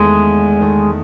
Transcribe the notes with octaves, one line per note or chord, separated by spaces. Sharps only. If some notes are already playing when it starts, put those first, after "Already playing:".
Already playing: E2 D#3 G#3 A3
E2 D#3 A3